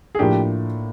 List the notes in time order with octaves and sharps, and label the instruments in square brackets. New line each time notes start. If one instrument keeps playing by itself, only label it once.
[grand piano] G#4
[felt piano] A2 F3 A#3 D4 [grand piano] G4